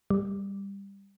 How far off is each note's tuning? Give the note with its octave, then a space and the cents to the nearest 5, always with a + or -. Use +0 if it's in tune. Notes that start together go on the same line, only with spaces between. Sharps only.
G3 +15